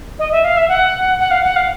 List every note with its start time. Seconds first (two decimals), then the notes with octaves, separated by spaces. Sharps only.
0.19 D#5
0.31 E5
0.44 F5
0.57 E5
0.68 F#5
1.19 F#5
1.31 F5
1.43 F#5
1.56 F5